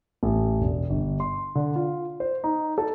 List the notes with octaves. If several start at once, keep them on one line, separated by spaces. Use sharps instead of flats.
A1
E1
G1
C6
D3
F4
C5
D#4
A4